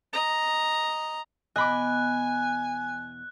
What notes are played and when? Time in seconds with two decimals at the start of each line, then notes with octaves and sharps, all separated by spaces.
0.13 D#5 A#5
1.56 E2 B2 D#5 G#5 B5 D6 F#6